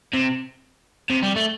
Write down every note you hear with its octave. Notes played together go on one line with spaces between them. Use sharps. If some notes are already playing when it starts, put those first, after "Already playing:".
C3
C3
G3
A3